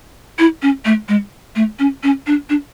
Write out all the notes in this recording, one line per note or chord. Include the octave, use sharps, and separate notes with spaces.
E4
C#4
A3
G#3
A3
C#4
C#4
D4
D4